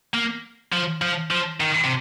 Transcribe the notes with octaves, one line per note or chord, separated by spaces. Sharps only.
A#3
F3
F3
F3
D#3
C3